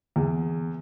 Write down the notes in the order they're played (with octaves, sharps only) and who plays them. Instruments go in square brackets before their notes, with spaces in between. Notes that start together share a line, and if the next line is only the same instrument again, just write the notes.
[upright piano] E2